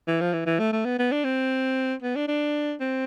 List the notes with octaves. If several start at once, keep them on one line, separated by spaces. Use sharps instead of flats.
E3
F3
E3
E3
A3
A3
B3
B3
D4
C4
B3
D4
D4
C4